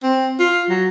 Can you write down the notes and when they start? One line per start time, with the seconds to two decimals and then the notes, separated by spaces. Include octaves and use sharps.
0.03 C4
0.39 F4
0.69 F#3